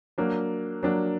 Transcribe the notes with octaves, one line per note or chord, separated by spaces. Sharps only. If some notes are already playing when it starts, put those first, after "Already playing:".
F#3 A#3 D4
F#3 A#3 D4